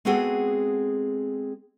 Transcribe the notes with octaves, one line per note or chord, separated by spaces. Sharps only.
G#3 B3 C4 F#4 G#4 A4